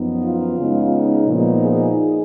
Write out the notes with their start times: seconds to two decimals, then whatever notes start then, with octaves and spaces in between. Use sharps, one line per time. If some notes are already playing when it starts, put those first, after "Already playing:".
Already playing: F#2 F3 B3 D#4
0.23 F4
0.58 C#3 G#3 B3 D#4
1.27 A#2 F3 B3 D#4
1.62 G#4